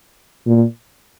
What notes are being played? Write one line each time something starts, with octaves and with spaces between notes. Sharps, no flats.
A#2